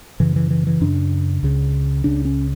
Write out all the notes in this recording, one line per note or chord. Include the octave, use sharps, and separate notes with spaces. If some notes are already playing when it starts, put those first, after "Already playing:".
F#2 C#3 E3
E3
E3
E3
F#2 C#3 D4
C#2 C#3
C#2 C#3 D4
C#4